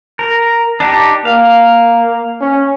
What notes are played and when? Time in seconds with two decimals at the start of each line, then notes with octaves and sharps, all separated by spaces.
0.19 A#4
0.80 D4 D#4 G4
1.25 A#3 F5
2.41 C#4